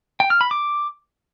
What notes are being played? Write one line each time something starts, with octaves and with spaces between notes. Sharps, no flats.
G5
F6
B5
D6